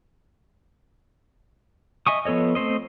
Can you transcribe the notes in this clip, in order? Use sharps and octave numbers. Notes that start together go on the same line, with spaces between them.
D#5 E5 G#5 C#6 D#6
F3 B3 A4 C#5 D#5
A3 C4 C5 D#5